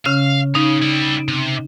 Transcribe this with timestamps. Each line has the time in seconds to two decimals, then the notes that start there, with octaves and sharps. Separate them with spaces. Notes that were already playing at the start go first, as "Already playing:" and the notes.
0.05 C#3 C#4 F5 F6
0.55 C#3 D#4
0.82 G3 E4
1.28 C3